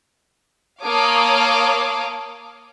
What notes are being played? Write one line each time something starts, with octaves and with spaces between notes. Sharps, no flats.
A#3 C#5 F5 A5 D6 D#6